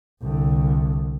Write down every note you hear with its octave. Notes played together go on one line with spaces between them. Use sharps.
C2 D3